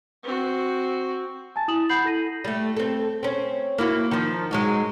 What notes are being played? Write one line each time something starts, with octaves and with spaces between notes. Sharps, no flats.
C4 F#4
G#5 A5 A6
E4 D#6 E7 F#7
F#5 B5 G6 C7 F#7
E4 A4 A#6 D#7
G3 A3
C4 A4
C4 C#4
A#3 E4 F#4
D#3 F3
G#2 F#3 G#3